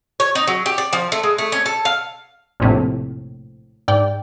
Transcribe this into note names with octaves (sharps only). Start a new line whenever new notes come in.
C#5
D#4
F#3
G4
D5
F3
A3
G#3
A3
C#4
A4
F5
A#1 F2 A2 C3
G#2 D5 G5